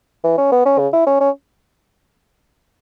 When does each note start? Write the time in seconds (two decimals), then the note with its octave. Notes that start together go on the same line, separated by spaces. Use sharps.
0.24 E3
0.38 C#4
0.52 B3
0.66 C#4
0.78 C#3
0.93 E4
1.06 C#4
1.20 C#4